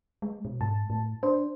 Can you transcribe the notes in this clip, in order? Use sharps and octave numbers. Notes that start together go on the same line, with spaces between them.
G#3
B2
G#2 A5
A2
D4 C5